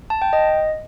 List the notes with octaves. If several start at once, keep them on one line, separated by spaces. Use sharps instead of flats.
A5
G5
D#5